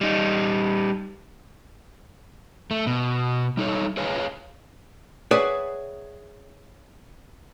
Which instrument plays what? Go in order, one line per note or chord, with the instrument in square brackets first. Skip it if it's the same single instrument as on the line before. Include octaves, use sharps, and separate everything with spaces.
[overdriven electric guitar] G3 D#4
[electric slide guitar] A3
B2
G3 D#4 A4 C#5
G#4 B4 C#5 F5 G#5
[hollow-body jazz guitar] G#4 B4 C#5 D5 E5 F#5